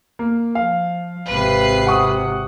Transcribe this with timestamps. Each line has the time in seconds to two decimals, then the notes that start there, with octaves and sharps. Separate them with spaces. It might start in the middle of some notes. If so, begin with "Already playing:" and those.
0.19 A#3
0.55 F3 F5
1.29 G#1 C3 B4 C7
1.87 F#5 C#6 D#6